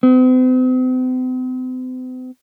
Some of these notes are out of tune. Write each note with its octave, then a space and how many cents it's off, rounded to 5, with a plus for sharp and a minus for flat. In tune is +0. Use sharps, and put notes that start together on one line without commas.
C4 -45